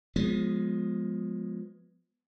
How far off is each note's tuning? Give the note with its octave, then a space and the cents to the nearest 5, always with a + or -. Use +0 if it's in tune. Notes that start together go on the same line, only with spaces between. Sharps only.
F3 +25 G#3 +0 B3 +0